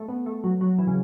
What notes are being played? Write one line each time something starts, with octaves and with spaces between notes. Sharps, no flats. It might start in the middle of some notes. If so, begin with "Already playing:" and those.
Already playing: A3
B3
A3
F#3
F#3
E3
C#3